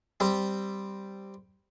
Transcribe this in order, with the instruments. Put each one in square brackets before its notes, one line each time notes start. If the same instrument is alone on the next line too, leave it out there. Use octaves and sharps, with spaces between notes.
[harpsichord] G3 C4